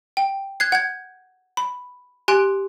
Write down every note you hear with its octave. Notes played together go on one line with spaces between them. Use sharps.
G5
F#6 G#6 C7
F#5 G6 G#6
B5
G4 G#5 C6 F#6 D7